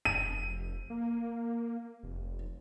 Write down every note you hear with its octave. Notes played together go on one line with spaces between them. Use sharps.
F1 D#7
A#3
F1